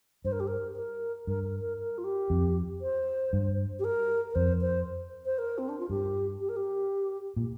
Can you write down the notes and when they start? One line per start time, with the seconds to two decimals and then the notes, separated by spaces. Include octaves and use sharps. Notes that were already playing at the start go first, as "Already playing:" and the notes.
0.25 G2 C5
0.32 A#4
0.40 G4
0.47 A#4
0.76 A#4
1.27 G2 A#4
1.44 A#4
1.61 A#4
1.79 A#4
1.98 F4
2.04 G4
2.30 F2
2.81 C5
3.33 G2
3.79 G4
3.84 A#4
4.30 A#4
4.35 F2 C5
4.61 C5
5.26 C5
5.38 A#4
5.58 C4
5.69 D4
5.79 F4
5.90 G2 G4
6.40 G4
6.49 A#4
6.56 G4
7.36 A#2